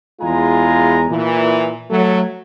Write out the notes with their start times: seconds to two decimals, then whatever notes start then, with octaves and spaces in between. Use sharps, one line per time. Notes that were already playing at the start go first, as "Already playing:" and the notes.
0.21 E2 G#3 E4 F4 G#5 A#5
1.09 A#2 E3
1.90 F#3 A3